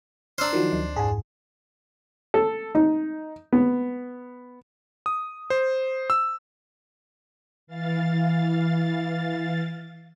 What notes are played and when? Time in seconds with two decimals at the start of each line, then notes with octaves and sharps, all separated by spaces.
0.38 D4 C5 A#5 E6 F6
0.53 D#3 F3 F#3
0.72 D2
0.96 F2 G#2 G#4
2.34 A4
2.75 D#4
3.53 B3
5.06 D#6
5.50 C5
6.10 E6
7.67 E3 F5 A6